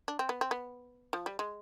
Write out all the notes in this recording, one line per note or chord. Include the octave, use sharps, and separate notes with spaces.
D4
C4
B3
C4
B3
F3
G3
G#3